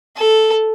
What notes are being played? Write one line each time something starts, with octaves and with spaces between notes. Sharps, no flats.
A4